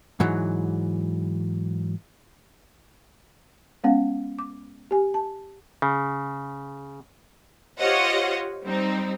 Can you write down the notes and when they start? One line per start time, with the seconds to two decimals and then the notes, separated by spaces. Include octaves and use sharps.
0.20 G#2 E3 F#3
3.84 G#3 B3 C#4 F5 F#5
4.39 D6
4.91 G4 G#5
5.14 A5
5.82 C#3
7.79 F4 G4 C5 C#5 D#5 F#5
8.65 G3 C4 D#4